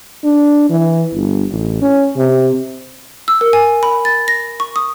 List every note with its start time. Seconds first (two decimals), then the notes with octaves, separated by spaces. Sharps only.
0.24 D4
0.70 E3
1.14 G1
1.52 A1
1.82 C#4
2.17 C3
3.28 E6
3.41 A#4
3.53 G#5
3.83 B5
4.05 A6
4.28 A#6
4.60 C#6
4.76 D#6